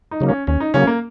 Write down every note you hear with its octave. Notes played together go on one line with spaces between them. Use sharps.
D#4
C#3 F#3 A#3
C#4
D#2 C#4
D#4
C#3 F#3 A#3 C#4
A#3